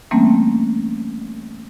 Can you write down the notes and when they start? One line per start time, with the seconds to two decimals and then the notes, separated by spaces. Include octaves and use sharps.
0.11 E3 G3 A3 A#3 C4 C#4